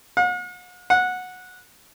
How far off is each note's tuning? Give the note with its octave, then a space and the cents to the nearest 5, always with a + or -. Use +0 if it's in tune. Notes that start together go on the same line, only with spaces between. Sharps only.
F#5 -45
F#5 -15